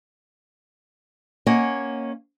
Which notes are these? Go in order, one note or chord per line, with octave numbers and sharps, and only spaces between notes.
A#3 C#4 D#5 F#5